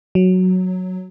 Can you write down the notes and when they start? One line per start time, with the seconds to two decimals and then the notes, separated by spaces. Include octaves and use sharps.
0.15 F#3